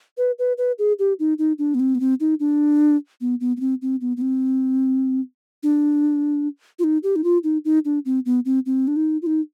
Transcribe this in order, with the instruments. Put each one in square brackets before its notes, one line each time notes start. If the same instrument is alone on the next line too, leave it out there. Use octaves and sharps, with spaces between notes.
[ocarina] B4
B4
B4
G#4
G4
D#4
D#4
D4
B3
C4
B3
C4
D#4
D4
B3
B3
B3
C4
C4
B3
B3
C4
D4
F4
D#4
G4
D#4
F4
D#4
D#4
D4
C4
B3
C4
C4
D4
D#4
F4
D#4